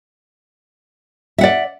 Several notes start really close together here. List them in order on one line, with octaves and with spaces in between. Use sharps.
E5 F#5 D5